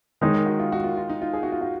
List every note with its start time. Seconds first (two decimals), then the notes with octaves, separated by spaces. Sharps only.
0.21 D#3 G#3 D#4 C#5
0.34 A#4
0.46 F#4
0.60 F4
0.72 F#4
0.84 F4
0.97 F4
1.09 D#4
1.22 F4
1.33 G#4
1.43 F#4
1.52 F4
1.61 F#4